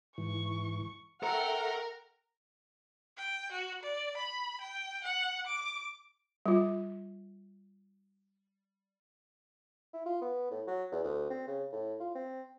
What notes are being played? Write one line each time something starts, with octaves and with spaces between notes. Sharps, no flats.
G#2 E3 C#6
A4 A#4 E5 F#5 G5 A#5 C#6 F6
G5
F#4
D5
B5
G5
F#5
D6
G3 F4
E4
F4
B3
A2
F#3
E2
D2
C4
C#3
A2
F4
C4